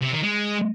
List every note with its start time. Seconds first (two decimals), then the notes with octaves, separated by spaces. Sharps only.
0.02 C3
0.13 D#3
0.24 G#3